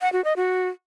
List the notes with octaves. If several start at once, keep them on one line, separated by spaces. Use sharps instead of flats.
F#5
F#4
D#5
F#4